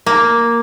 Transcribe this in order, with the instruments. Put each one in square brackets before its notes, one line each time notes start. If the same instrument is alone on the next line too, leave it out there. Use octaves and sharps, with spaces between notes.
[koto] A#3